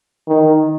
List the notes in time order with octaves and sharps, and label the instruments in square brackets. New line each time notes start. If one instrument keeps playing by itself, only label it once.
[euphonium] D#3